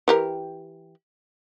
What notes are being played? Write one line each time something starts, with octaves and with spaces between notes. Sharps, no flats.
E3 G4 A#4